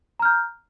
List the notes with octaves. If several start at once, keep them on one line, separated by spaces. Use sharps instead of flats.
A#5 F6 G6